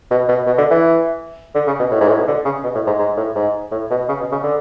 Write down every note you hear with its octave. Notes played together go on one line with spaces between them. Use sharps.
B2
B2
B2
D3
E3
D3
C#3
B2
A2
G#2
A2
B2
D3
C#3
B2
A2
G#2
G#2
A2
G#2
A2
B2
C#3
B2
C#3
D3